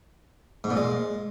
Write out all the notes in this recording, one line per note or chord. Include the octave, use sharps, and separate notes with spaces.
G#2
A#2
G#3